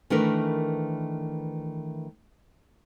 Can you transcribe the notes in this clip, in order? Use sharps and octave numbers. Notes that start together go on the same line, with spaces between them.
D#3 E3 A3 D4 A#4 B4